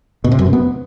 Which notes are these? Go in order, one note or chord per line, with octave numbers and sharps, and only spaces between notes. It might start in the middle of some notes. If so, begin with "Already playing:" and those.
B2
C3
F#2
C3
B3